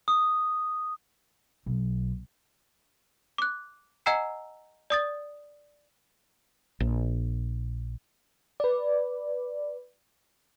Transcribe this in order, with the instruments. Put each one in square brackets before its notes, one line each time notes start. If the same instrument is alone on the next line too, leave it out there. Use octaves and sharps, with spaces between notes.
[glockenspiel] D#6
[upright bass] B1
[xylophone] D6 F#6
D#5 F#5 G#5 A#5 E6 C7
D5 D#6 A6
[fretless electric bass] A#1
[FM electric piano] B4 D5